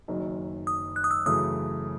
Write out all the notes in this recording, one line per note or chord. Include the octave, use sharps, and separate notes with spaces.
F#1 F#2 D#3
D#6
F#6
D#6
E6
F#2 C#3 E3 A3 D#6